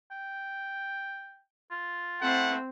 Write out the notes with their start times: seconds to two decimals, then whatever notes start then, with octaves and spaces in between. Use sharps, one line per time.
0.11 G5
1.71 F4
2.21 A3 C4 E4 F#5